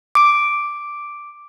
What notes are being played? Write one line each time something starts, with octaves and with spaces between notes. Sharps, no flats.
D6 D7